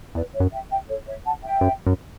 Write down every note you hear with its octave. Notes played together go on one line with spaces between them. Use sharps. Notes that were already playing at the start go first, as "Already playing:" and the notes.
E2 B4 D5
C#5 E5
F#2
E5 G5
E5 G5
A4 C#5
C#5 E5
F#5 A5
E5 G5
F#2
F#2